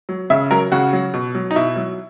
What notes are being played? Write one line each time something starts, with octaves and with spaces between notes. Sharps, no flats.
F#3
C#3 E5
F#3 A#4
C#3 F#4
F#3
B2
F#3
D#4
B2 E4
F#3